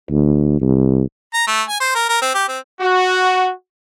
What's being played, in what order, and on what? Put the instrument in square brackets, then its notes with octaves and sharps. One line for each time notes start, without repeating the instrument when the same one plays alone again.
[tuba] D2
C2
[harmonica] A#5
A3
G#5
C5
A#4
A#4
C4
G4
C4
[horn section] F#4